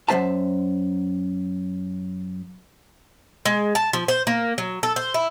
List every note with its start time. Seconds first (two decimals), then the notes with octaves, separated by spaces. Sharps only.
0.08 F#2 G#3 C5 E5 A5
3.46 G#3
3.75 A5
3.93 F3
4.08 C5
4.27 A#3
4.58 F#3
4.83 A4
4.96 C5
5.14 E4